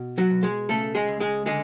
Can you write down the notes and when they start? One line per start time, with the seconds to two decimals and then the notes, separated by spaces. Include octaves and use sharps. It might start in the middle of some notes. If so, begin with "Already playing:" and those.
Already playing: B2
0.18 F#3 F#4
0.30 B2
0.43 G#3 G#4
0.69 C#3 A3 A4
0.95 G#3 G#4
1.07 C#2
1.20 G#3 G#4
1.46 D3 G#3 G#4